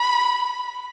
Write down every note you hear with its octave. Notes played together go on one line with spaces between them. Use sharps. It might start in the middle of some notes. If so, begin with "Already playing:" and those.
Already playing: B5